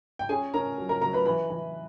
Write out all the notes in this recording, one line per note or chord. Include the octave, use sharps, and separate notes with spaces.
G5
C#4 G#4 G#5
C#4 A#4 A#5
F#3
A#4 A#5
F#3 A#4 A#5
B4 B5
E3 B4 B5
E3